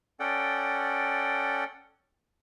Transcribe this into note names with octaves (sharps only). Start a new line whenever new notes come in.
C#4 A4 D5 F#5 G5